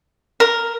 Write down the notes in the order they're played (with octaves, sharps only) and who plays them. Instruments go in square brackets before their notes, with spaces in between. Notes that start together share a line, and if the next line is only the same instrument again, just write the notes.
[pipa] A#4